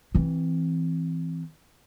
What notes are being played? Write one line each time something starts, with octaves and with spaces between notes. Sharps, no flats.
E3 C4